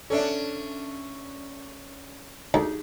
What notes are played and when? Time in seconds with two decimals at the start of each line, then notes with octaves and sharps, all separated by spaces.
0.10 C#4 D4 A4 D5 E5
2.54 D2 D#4 G4 G#4